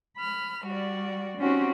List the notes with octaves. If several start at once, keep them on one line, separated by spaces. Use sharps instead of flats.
B5 F6
G3 F#4 D5
C4 C#4 D#4 F#4 G4